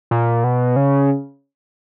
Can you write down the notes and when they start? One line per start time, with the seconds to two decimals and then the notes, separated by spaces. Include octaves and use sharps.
0.11 A#2
0.44 B2
0.76 C#3